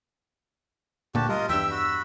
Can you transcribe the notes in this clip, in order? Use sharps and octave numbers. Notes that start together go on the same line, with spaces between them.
D2 A#2 F#4 G4 A5
G3 F4 A#4 D#5
E2 G2 E5 G5 E6
F#4 B5